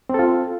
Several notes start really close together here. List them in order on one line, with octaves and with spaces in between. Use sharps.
C4 A4 F4